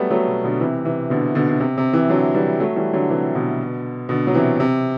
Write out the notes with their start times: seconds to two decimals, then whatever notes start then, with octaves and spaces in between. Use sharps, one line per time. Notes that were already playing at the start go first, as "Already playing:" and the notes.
Already playing: F#3 G3 A3 B3
0.11 F#3 A3
0.27 B2
0.44 B2 D3
0.60 C3 E3
0.85 C3 E3
1.10 B2 D3
1.35 B2 D3
1.49 D3
1.60 C3
1.78 C3
1.93 C3 E3
2.10 D3 F#3
2.34 E3 G3
2.60 F#3 A3
2.76 E3 G3
2.93 D3 F#3
3.10 C3 E3
3.35 B2 D3
4.09 B2 D3
4.27 F#3
4.34 C3 E3
4.60 C3